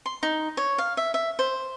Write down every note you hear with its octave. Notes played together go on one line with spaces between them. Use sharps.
C6
D#4
C#5
F5
E5
E5
C5